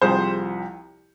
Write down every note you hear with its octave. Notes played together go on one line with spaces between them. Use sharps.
C2 C3 F3 G#4 C5